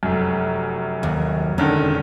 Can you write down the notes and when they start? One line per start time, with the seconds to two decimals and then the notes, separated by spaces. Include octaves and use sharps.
0.03 F1 F#2
1.03 D#2
1.58 E1 D3 D#3 C#4